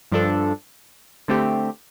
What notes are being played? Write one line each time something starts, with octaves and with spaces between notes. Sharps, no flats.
G2 F3 D4 A4
D3 A3 C4 G4